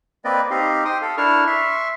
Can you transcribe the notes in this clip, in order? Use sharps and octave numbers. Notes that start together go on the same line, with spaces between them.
A#3 C4 B4 D5 D#5
C4 D#4 G4 D#5 F5
G5 C6 D#6
A4 F5
D4 E4 A#4 A5 C#6 F6
E5 C6 C#6